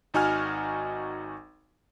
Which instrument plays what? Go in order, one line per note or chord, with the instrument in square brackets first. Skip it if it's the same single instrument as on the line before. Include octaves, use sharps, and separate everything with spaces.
[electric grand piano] G#1 D#4 F#4 G#5 F6